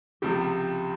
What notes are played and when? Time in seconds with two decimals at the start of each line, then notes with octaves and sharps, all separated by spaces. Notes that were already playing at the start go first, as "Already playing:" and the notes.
0.22 C#2 C3 F3 G4